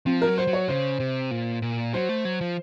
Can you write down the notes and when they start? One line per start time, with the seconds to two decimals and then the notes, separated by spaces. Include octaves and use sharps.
0.06 F3 C4
0.22 A#4
0.27 F#3
0.38 C5
0.47 F#3
0.53 C#5
0.69 C#3 C5
1.00 C3
1.31 A#2
1.62 A#2
1.93 F#3 C5
2.09 A3
2.25 F#3
2.41 F3